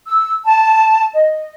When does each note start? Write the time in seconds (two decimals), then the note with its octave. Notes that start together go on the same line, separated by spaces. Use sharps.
0.07 E6
0.46 A5
1.14 D#5